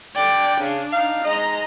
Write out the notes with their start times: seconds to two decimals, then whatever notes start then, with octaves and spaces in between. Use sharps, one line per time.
0.16 D3 D5 G5
0.60 C#3 D4
0.92 D#4 F5
1.25 G#2 G#3 D#5 A#5